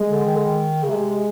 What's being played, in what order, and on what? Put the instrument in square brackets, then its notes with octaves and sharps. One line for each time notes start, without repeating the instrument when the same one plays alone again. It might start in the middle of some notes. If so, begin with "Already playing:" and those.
Already playing: [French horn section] G#3
[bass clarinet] D3
D#3
D3
D#3
C#3
[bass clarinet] C3 [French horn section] G#3